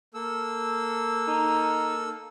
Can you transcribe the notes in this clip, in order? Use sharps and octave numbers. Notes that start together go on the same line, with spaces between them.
A#3 A4 E6
D#4